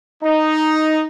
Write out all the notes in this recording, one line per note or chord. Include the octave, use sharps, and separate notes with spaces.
D#4